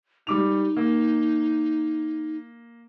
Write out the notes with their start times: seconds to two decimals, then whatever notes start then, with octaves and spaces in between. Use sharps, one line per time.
0.27 G3 D#4 D6 F7
0.77 A#3